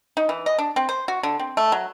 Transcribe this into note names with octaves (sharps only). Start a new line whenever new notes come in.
D#4
E3
D#5
D4
C4
C5
F#4
D3
C4
A3
F#3